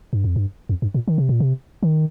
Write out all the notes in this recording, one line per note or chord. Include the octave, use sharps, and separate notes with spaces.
G2
F2
G2
F2
G2
A#2
D#3
C3
A#2
C3
D#3